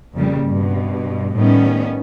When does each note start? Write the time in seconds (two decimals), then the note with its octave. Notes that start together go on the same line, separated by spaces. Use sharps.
0.14 F2 A#2 C#3 G3
0.45 G2 B2
1.35 A2 D#3 G3 B3 C#4